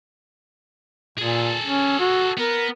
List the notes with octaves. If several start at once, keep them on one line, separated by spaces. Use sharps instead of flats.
A#2 G#4 A4
C#4
F#4
B3 A#4